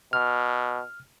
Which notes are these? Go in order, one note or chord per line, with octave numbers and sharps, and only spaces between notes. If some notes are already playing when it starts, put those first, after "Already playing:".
B2 F6